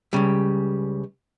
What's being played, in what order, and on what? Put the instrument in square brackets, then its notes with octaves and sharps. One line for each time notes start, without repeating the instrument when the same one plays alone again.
[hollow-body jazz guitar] C#2 C#3 G3